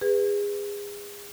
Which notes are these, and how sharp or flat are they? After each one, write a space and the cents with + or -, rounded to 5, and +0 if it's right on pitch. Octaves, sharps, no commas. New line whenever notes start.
G#4 -30 B4 +0